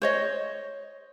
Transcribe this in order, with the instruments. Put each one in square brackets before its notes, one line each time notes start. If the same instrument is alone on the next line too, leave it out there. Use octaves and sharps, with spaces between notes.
[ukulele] C5 C#5 D#5